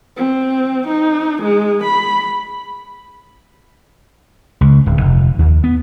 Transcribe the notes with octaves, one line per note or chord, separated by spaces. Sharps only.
C4
D#4
G#3
B5
C#2
D1
F1
D#2
B3